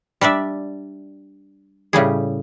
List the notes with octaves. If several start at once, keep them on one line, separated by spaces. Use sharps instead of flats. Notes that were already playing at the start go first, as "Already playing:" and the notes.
G3 D4 D5 E5
A2 C#3 G3 G#4